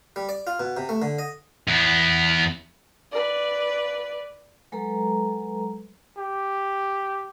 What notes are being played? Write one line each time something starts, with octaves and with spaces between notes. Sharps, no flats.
G3
D5
F4
B2
C3
A3
D3
D#5
E2 B3
B4 D5
F#3 G#3 A4 B4 A#5
G4